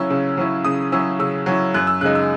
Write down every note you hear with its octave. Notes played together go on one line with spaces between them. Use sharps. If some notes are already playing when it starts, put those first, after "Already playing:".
Already playing: C#3 F#3 C#4 E4 E6
C#3
F#3 C#4 E4
C#3 D#6
F#3 C#4 E4 E6
C#3 E6
F#3 C#4 E4
F#2 F#6
E6
C#3 G#3 D#4 F#6
E6